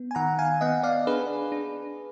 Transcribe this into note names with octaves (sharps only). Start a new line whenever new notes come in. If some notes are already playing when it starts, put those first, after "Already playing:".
Already playing: B3
G#5
D#3 F#5 A#5
F5 G#5
B3 D#5 F#5
D5 F5
D4 G#4 B4
D4